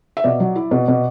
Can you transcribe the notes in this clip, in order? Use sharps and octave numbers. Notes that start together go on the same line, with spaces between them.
E5
B2 D5
F#3
E4
B2
B2